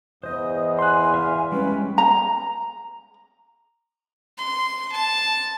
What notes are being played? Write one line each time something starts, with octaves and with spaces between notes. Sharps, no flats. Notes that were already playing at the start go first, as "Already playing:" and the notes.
E2 C5 D#5 D#6
G#5 C6 F#6
E5 F5 F6
G3 G#3 C#4 B4
A#5
C6
A5